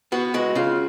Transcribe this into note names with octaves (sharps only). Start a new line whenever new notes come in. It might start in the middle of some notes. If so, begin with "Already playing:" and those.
B3 F#4
G#3 F#4
C#3 F4